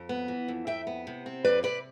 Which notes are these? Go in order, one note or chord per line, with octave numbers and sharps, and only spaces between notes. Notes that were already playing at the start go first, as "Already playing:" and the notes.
Already playing: F2
B3
E3
F2
F2 E5 G5
B3
C3
C4
F2 B4 D5
C3 B4 D5